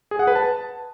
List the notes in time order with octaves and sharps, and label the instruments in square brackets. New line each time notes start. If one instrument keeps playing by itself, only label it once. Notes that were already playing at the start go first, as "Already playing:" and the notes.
[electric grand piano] G#4
F#5
B4
A5